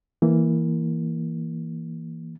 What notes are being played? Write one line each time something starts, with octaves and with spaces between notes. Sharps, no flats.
E3 A#3